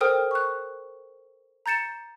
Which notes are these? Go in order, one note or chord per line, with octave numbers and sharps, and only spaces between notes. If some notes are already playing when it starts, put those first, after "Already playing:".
A4 A#4 C5 G5 D#6 F6
C#6 F#6
A#5 G6 A6 C#7 E7